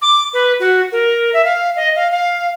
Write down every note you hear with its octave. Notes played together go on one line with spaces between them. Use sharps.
D6
B4
F#4
A#4
E5
F5
D#5
F5
F5